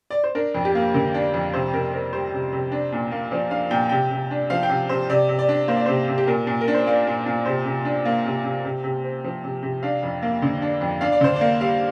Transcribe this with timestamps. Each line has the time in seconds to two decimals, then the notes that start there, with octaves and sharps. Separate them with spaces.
0.10 D5
0.24 C5
0.35 D4 A#4
0.54 F2
0.65 G4
0.75 A#3
0.94 D3 A#4
1.14 D4
1.34 F2
1.53 C3 C5
1.73 C3 A#4
1.93 C4 A#4
2.13 G3 C5
2.33 C3
2.52 C3
2.72 D4
2.92 A#2
3.11 A#3
3.31 F3 D5
3.51 D4 F5
3.71 A#2 G5
3.89 C3 G5
4.11 C3
4.31 D4
4.50 F3 F5
4.63 G5
4.69 C3 F5
4.89 C3 C5
5.09 C3 D5
5.29 C3
5.39 D5
5.49 D4
5.68 A#3 C5
5.77 D5
5.86 C3 C5
6.08 C3
6.18 G4
6.27 A#2 A#4
6.47 A#2
6.61 A#4
6.68 D4
6.74 C5
6.87 A#3 D5
7.07 A#2
7.26 A#2
7.45 C3 C5
7.66 C3
7.85 D4
8.05 A#3
8.26 C3
8.44 C3
8.65 C3
8.84 C3
9.04 C4
9.24 F3
9.44 C3
9.63 C3
9.83 D4 F5
10.03 F2
10.22 A#3
10.42 D3
10.62 D4
10.81 F2
11.01 D4 F5
11.12 D5
11.21 D3 C5
11.36 D5
11.41 A#3
11.61 G3 F5